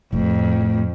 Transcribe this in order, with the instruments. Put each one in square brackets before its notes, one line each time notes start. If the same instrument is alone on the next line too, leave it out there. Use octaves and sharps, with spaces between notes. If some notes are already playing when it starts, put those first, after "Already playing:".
[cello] F2 [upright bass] A2